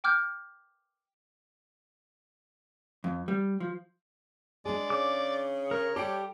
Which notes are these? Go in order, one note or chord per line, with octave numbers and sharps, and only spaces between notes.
G5 D6 F6 G6
F2
G3
F3
G#3 D4 G#4 D5
C#3 D6
A#4 C#5
G3 G4 A4 G5